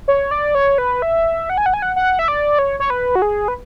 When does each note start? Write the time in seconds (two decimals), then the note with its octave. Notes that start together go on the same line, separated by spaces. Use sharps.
0.08 C#5
0.31 D5
0.55 C#5
0.78 B4
1.02 E5
1.50 F#5
1.58 G#5
1.66 F#5
1.74 G#5
1.82 F#5
1.96 F#5
2.19 E5
2.28 D5
2.59 C#5
2.80 C#5
2.90 B4
3.15 F#4
3.22 G#4
3.48 B4